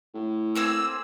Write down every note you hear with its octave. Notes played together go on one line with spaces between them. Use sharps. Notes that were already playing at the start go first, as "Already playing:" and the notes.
A2
A#3 C4 G#4 E6